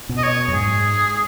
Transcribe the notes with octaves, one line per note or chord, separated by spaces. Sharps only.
B2
D#5
C#5
F#2
G#2 G#4